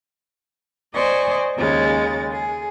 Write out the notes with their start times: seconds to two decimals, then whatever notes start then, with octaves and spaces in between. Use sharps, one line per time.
0.95 C5 D5 D#5 G#5 C#6
1.57 D#2 C#3 G#3 A6
2.31 G#4